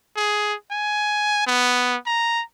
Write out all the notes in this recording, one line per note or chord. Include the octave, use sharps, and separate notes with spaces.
G#4
G#5
B3
A#5